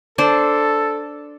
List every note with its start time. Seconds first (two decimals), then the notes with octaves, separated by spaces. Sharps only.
0.18 D4 A4 C5 D5